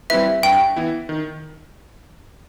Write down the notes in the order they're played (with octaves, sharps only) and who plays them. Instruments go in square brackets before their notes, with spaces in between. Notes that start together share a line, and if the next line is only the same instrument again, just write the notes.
[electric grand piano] G3 C4 E4 B4 [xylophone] E5
[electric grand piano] G2 [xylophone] G5
[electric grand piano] E3 B3 E4
D#3